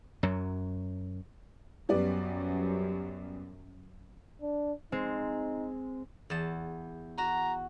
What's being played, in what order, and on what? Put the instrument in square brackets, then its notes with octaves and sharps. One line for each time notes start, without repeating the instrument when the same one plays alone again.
[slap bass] F#2 F#3
[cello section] F#2 [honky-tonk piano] G3 B3 D5
[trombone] D4
[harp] G#3 C4 [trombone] D#4
[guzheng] E2 A5
[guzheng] F#4 [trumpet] A#5